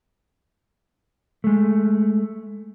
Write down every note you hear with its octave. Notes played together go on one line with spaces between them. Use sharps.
G#3 A3